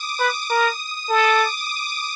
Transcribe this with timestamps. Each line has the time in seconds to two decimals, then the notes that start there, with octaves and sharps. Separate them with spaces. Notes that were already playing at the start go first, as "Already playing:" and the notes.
Already playing: D6 D#6
0.20 B4
0.50 A#4 D#6
1.10 A4 D6